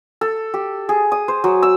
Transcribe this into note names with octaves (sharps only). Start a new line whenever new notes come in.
A4
G4
G#4
D#6
C5
F#3
E6